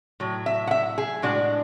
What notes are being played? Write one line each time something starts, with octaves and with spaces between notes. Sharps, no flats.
A2 F#3
E5
F#5
E5
G#4
A2 G#3 D4 F#4